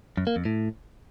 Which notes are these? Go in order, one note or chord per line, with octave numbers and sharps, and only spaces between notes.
F#2
A#3
F2
A2